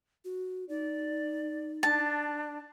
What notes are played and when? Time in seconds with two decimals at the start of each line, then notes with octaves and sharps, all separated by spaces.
0.25 F#4
0.69 D#4 D5
1.83 D4 A5